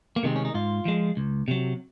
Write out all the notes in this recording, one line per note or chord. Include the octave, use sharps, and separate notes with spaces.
A#3
C3 D#3 G#3 C4
C#4
D#4
G#2 F4
F3 G#3
C#2
C3 F#3